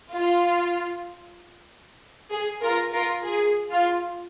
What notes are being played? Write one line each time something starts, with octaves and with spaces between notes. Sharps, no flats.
F4
G#4
F4 A#4
F4 A#4
G#4
F4